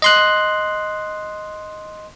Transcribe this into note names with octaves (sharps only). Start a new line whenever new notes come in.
D#5 C6 F#6